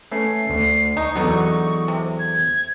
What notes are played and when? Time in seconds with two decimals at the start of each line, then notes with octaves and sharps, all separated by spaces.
0.12 A3 C#4 B4 C7
0.50 D2 C7
0.97 D#4 C#6
1.16 E2 D3 F#3 B3 D#4
1.88 C3
2.19 G#6